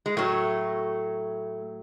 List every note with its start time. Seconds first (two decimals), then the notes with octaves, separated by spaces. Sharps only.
0.06 G#3
0.17 A2 F#3 A3